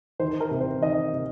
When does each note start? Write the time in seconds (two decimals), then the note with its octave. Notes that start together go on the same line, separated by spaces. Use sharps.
0.19 D#3 C5
0.40 A#4
0.51 C3
0.61 C5
0.82 D#3 D#5
1.13 C3